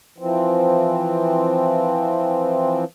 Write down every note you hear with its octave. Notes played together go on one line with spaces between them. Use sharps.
E3 F3 C4